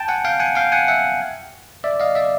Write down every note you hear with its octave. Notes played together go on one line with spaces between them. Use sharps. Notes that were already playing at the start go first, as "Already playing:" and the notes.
Already playing: G5 A5
F#5 G#5
F5 G5
F#5 G#5
F5 G5
F#5 G#5
E5 F#5
D5 E5
D#5 F5
D5 E5